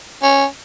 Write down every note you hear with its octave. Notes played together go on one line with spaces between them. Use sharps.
C#4